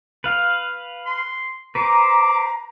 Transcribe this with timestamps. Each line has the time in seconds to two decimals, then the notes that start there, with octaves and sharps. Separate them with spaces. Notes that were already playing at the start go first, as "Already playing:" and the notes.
0.24 B4 F5
1.06 C6
1.75 B4 C5 A#5 D6